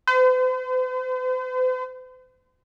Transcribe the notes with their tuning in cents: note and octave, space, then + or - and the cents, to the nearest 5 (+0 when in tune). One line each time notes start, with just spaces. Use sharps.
C5 -45